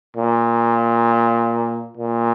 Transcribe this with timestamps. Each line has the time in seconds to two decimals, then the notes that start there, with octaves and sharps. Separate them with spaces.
0.17 A#2
1.97 A#2